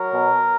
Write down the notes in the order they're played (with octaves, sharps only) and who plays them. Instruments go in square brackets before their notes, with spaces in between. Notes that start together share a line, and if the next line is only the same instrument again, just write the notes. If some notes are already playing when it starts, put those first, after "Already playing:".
Already playing: [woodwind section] F#3 A#4
B2